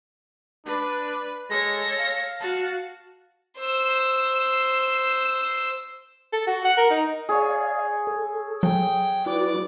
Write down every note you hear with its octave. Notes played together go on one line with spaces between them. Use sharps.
D4 B4
G#3 A4 C#5 A#6
F5
F#4 A5
C5 E6
A4
F#4
F#5
A#4
D#4
G#4 C#5 D5 F5
A4
F#3 G5
E4 F#4 B4 D5 D6